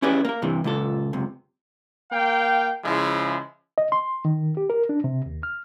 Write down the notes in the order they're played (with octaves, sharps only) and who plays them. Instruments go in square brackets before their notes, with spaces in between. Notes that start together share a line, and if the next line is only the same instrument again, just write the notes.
[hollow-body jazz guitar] C#4 E4 G4 G#4 B4 D5
A#3 A#4
G2 C3 E3
C#2 A#2 A4
C#2 F#2 C3
[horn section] A#3 F5 G5
C#3 F3 G#3 E4
[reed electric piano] D#5
C6
D#3
G4
A#4
D4
C3
D#2
F6